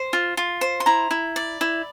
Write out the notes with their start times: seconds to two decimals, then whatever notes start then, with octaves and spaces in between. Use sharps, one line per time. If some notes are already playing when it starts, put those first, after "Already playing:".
Already playing: C5
0.13 F4
0.37 F4
0.61 C5
0.80 C6
0.86 E4 A#5
1.11 E4
1.36 D5
1.61 E4